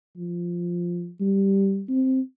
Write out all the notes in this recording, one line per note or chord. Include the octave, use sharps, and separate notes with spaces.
F3
G3
C4